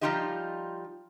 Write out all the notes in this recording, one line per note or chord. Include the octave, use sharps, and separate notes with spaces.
F3 G3 D#4 F4 G4 D#5